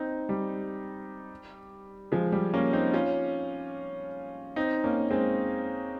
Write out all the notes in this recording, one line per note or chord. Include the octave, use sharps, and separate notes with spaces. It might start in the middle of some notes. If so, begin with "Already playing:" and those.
Already playing: C4 D#4
G3
F3 G#3
G3
A#3 C#4
C4 D#4
C#4 F4
C4 D#4
A#3 C#4
G#3 C4